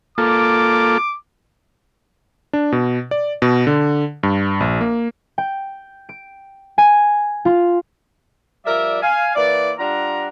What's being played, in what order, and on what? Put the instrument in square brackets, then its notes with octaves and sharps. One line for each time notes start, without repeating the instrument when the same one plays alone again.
[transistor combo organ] A#3 F4 A4 [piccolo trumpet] D6
[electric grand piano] D4
B2
D5
B2
D3
G2
A#1
A#3
[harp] G5
D7
G#5
F4
[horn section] F3 G3 A#4 D5 E5
F5 G#5
E3 A#3 E4 D5
G3 D4 F4 F#5 A#5